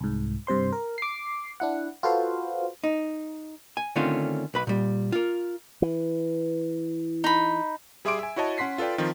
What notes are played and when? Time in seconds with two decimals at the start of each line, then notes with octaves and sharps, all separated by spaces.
0.01 C2 G#2
0.47 G2 C3 C5 C6
0.73 A#4
0.98 D6 C7
1.60 D4 E4 F#5
2.03 F4 F#4 A4 B4 C5 F5
2.84 D#4
3.77 G#5
3.96 D3 D#3 A3 C4 C#4 F4
4.54 B1 B4 B5
4.67 A#2 G3
5.12 F4 A#4
5.82 E3
7.24 D#4 B5
8.05 G3 G#4 E5 C6 D6 D7
8.19 E5 G#5
8.36 E4 F#4 C#5 D#5 A5
8.58 C#4 F#5 C6 B6 C7
8.78 F4 A4 B4 D5 G5
8.98 D#3 F3 C4 F4